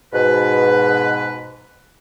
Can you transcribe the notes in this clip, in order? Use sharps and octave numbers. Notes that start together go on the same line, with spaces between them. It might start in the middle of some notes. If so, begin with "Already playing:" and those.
G#2 B2 B4